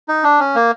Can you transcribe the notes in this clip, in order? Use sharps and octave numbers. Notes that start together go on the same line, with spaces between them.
D#4
D4
C#4
A#3